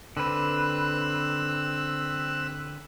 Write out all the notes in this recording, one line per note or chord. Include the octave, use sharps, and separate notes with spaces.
D3 C4 B4 E6 F#6